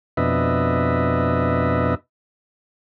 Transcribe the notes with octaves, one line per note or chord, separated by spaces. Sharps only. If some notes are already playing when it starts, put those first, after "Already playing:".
F2 B2 D4 B4 D#5 E5